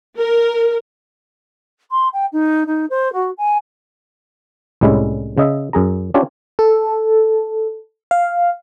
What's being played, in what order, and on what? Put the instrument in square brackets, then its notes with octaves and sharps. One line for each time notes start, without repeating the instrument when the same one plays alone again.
[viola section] A#4
[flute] C6
G5
D#4
D#4
C5
F#4
G#5
[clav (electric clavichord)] C2 A2 G3 G#3 C#4 E4
C#3 D#5 E5
F#2 G#4 A#5
C#4 D4 F4 G4 C#5
[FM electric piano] A4
F5